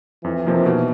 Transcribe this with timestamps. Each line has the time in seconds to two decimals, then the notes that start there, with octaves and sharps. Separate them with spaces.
0.24 F2 E3
0.46 C3 F3 A#3 D#4
0.66 B2